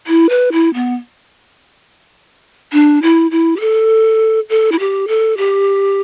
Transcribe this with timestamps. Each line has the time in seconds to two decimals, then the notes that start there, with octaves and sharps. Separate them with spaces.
0.07 E4
0.30 B4
0.52 E4
0.74 B3
2.73 D4
3.02 E4
3.31 E4
3.56 G4
3.60 A4
4.50 A4
4.72 E4
4.79 G4
5.08 A4
5.37 G4